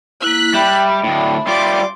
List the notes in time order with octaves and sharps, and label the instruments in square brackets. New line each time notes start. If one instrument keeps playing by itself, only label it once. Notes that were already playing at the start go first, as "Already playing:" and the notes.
[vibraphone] A#3 E4 [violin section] F#6 B6
[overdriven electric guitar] G3 [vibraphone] E5 B5 [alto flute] G5
[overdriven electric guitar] D2 A2 [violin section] D4 [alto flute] G5
[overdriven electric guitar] G3 F4 [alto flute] D5 [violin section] C6 D6